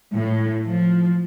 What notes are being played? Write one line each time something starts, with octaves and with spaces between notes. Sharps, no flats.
A2
F3